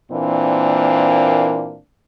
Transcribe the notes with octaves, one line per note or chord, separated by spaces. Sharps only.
A#2 E3 A#3 C4 D4